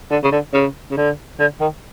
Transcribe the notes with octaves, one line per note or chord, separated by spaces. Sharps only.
D3
C#3
D3
C#3
C#3
D3
D3
D#3